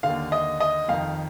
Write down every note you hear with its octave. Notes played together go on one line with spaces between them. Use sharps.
D#2 D3 F5
D#5
D#5
F2 D#3 F5